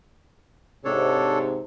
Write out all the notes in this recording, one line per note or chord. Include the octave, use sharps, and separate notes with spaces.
G#2 C3 D4 A4 C#5